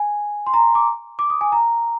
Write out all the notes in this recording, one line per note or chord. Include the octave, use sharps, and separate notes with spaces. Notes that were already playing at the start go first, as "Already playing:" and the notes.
Already playing: G#5
C6
A#5
D6
D6
D#6
G#5
A#5